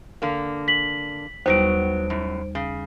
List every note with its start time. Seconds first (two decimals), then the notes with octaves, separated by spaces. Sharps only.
0.22 D3 A#3
0.68 B6 F#7
1.46 D#2 A2 F#3 G3 B3 C5 D7
2.10 F#2 A2
2.55 C#3